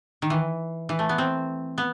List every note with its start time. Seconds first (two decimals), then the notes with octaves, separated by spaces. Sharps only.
0.22 D#3
0.30 E3
0.89 E3
0.99 A3
1.09 B3
1.18 C4
1.78 B3